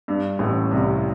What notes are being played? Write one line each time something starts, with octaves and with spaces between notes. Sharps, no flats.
G2
A1 A2
C2 C3